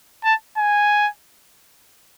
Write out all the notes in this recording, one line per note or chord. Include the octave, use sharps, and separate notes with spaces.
A5
G#5